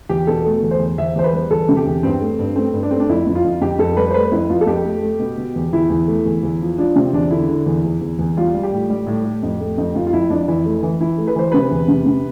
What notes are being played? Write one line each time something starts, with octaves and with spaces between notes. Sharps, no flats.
E2 G4
B2 A4
A3
E2
C5
E2
E2 E5
E2 C5
B4
G3
E2 A4
C3
G4
E2
G2 C4
A3
G2
A3 C4
G2
D4
A3 C4
D4
F2 E4
F2 E4
F4
F2
F2 G4
F2 A4
G3 B4
C5
A3 B4
F2 E4
F2 F4
A4
F2 G4
A3
A3
B2
B2
E2
E2 E4
E2
A3
E2
E2
F3
F3 D4
C3 C4
E2 D4
D3 E4
D3
E2
E2
E2
E2
G3 F4
G3
G4
A2
G3
A2
A2
F2
A3
F2
F2 F4
F4
F2 E4
F2 D4
E3 E4
A3
E3
E3 E4
A3
B4
E3 C5
C3 B4
E2
C3
C3